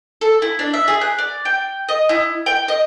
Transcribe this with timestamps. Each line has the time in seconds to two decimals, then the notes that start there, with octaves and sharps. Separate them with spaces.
0.21 A4
0.42 E4
0.59 D4
0.74 E5
0.88 G#4
1.01 F#6
1.18 D5
1.45 G5
1.89 D#5
2.09 E4
2.46 G5
2.68 D#5